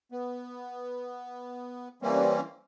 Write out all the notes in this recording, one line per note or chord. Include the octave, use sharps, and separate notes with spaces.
B3
E3 G3 A#3 C4 C#4